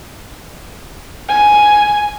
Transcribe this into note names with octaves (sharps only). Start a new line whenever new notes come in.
G#5